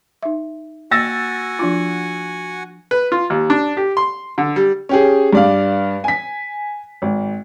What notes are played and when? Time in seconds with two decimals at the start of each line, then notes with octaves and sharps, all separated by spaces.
0.23 D#4 E5
0.91 A#3 F#4 F#5 G#5 E6 A6 A#6
1.59 F3 D4 F4
2.91 B4
3.12 F4
3.30 D#2
3.50 D4
3.77 G4
3.97 C6
4.38 D3
4.56 G3
4.89 C#4 G4 G#4
5.33 G2 D5 F5
6.04 G#5 B6
7.02 G#1